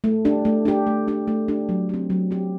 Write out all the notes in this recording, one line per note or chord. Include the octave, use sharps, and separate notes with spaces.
A3
D4 G4
A3
D4 G4
A3
D4 G4
A3
D4 G4
F#3
C4 G4
F#3
C4 G4